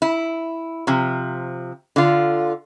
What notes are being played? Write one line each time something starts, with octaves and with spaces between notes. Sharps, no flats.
E4
C3 F3
D3 F4